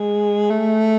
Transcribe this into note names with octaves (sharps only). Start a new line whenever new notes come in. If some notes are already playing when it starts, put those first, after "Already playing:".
Already playing: G#3
A3